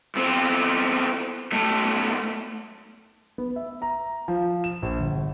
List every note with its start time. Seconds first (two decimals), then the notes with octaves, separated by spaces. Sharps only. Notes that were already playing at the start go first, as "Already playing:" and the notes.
0.15 E2 C4
1.52 B1 A3
3.38 B3
3.56 E5
3.82 A#5
4.28 F3
4.64 E7
4.82 A#1
5.00 G1